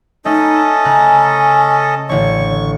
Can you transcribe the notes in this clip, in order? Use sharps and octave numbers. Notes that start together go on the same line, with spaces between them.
A3 C#4 D#4 A4 D#5
C#3 G#5 A#5 F#6
A1 D3 C#5 C#6